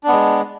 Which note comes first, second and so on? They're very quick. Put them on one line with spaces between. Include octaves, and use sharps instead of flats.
D4 B3 G#3